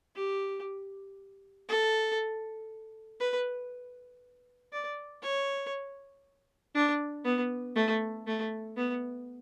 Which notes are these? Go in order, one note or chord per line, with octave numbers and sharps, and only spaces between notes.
G4
A4
B4
D5
C#5
D4
B3
A3
A3
B3